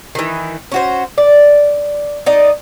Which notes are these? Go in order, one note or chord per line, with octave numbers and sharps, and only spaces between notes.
D#3 E3
C#4 F#4 C5
D5
D#4 D5 D#5